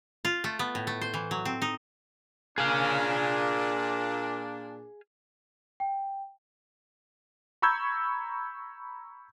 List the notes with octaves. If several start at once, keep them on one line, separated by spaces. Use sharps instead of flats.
F4
A3
B3
A2
A3
C5
E3
F#3
C4
D#4
A#2 D4 G#4 F5
G5
A#5 B5 C#6 E6 G6 G#6